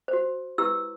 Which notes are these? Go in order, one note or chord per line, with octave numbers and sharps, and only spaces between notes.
F#4 C5
E4 G4 B4 E6